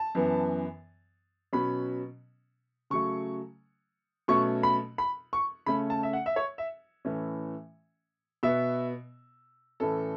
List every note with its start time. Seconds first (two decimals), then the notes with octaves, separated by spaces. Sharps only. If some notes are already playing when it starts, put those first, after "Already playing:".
Already playing: A5
0.15 F#2 E3 B3
1.53 B2 F#3 C#4 B5
2.90 C#3 F#3 A3 C#6
4.28 B2 F#3 A3 C#4 C#6
4.63 B5
4.98 B5
5.33 C#6
5.66 C#3 A3 C#4 B5
5.90 A5
6.03 E5
6.13 F#5
6.26 E5
6.36 C#5
6.58 E5
7.05 A2 E3 A3 C#4
8.43 B2 B3 E5
9.80 A2 E3 C#4 A4